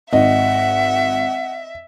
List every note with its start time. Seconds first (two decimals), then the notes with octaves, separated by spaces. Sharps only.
0.13 G#1 D#5 E5 F#5